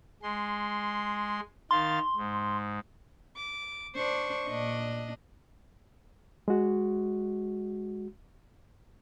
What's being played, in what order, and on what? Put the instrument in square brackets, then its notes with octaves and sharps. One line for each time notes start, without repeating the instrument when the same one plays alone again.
[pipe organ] G#3 C6
[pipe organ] D#3 F5 A6 [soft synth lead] C6
[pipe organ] G#2
[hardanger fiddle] D6
[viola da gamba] D4 C5 [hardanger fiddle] C#6
[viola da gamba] A#2 D4 D#5
[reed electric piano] G#3 F#4